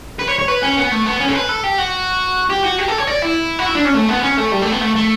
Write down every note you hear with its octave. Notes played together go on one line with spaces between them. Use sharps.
B4
C#5
C#5
B4
C#4
B3
A3
B3
C#4
A4
B4
A4
G4
F#4
G4
F#4
G4
A4
C#5
D5
E4
F#4
E4
D4
C#4
A3
B3
C#4
A3
G3
A3
B3
A3
A3